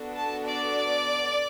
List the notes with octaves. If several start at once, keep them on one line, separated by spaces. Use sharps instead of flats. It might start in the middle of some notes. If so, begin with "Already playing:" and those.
Already playing: B3 D4 F#4 A4
A5
D5